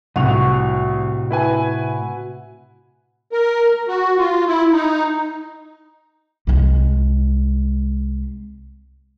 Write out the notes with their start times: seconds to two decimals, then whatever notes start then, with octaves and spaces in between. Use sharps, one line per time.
0.16 C2 A2 C3 C4 F#4 F7
1.31 E4 B4 G#5
3.32 A#4
3.88 F#4
4.18 F4
4.47 E4
4.72 D#4
6.47 C2 G#3